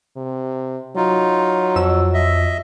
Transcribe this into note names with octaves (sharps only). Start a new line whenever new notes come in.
C3
F#3 D#4 F4
F2 E6
D#5 E5